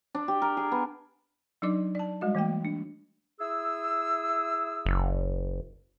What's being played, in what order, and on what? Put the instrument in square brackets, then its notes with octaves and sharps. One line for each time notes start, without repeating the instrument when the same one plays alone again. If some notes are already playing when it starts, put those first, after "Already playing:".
[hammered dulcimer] D4
G4
A#4
G#4
B3
[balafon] F#3 D4 D#4 D5 D6
D5 A5
G3 G#3 F#4 D#5
E3 A3 A#3 G5
D4
[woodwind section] E4 G#4 E6
[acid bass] F#1